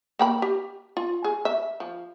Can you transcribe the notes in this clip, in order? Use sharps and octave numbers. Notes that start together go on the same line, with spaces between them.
A#3 G5 B5
G4
F4
G#4
E5
F3